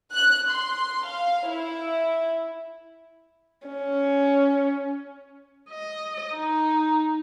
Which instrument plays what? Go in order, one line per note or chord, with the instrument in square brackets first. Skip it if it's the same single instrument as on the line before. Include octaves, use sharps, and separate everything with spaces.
[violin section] F#6
C6
F5
E4
[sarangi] C#4
[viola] D#5
D#4